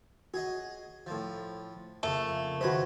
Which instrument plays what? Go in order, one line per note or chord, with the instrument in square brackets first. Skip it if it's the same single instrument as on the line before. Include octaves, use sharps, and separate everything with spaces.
[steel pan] F#4 [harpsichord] G#4 D#5
[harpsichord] A2 F3
[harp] F2 C#3 [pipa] A3 [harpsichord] A#3
[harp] D#3 F#5 B6 [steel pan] F#4 B4 C5 [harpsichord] G#4 D#5